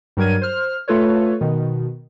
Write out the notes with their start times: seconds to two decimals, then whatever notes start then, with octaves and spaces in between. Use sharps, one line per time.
0.17 G2 F#3 A#4 G#6 D#7
0.41 C5 F6
0.88 A3 F4 A4 B4 C#5
1.41 B2 D#3